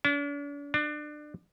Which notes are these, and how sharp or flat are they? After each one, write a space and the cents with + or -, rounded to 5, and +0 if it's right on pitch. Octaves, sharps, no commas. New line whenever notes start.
D4 -45
D4 +25